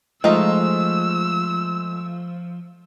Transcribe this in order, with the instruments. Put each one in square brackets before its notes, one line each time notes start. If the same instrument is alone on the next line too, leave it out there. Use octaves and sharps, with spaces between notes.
[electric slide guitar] F3 [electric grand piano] G#3 A3 [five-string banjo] D#4 F4 D#5 [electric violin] E6